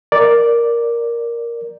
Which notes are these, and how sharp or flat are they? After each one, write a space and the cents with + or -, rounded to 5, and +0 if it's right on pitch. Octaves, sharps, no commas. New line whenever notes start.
A#4 +5 D5 +0